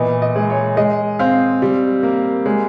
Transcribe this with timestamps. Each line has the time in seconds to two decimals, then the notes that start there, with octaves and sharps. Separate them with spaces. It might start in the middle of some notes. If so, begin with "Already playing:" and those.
Already playing: A#2 E3 B3 D#5
0.22 D#5
0.36 G#3
0.50 C#5
0.77 G#3 D#5
1.19 C4 F5
1.62 G3
2.03 A#3
2.46 G#3